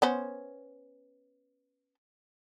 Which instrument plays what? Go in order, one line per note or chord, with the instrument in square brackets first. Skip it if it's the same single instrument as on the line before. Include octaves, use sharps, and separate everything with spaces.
[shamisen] B3 C#4 C5